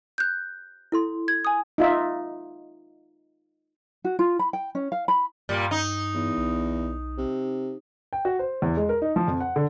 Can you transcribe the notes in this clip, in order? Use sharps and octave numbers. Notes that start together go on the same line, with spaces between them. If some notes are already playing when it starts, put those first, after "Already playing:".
F#6 G6
E4 A4 C6
G#6
G#5 D#6
D#4 F4 E5
F#4
F4
B5
G5
C#4
F5
B5
G2 A#2 G3
D#4
E2
B1
C3
G5
F#4
C5
E2
G#3
A#4
D#4
F3
F2
F#5
D3